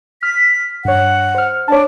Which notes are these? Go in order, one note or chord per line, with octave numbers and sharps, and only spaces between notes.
F6 B6
G2 C#5 F#5
C5 F6
D4 C#5 A5